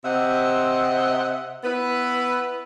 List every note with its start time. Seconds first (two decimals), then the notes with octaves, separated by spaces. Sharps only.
0.05 C3 C4 D#5 E5 F#5
1.64 B3 E4 B4